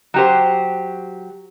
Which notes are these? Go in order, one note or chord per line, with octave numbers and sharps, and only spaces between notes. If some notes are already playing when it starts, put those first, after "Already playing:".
F#3 G4 C5